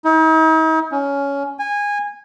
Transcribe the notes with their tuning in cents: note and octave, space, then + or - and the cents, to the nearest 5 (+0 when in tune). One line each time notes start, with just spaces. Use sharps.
D#4 +45
C#4 +15
G#5 -20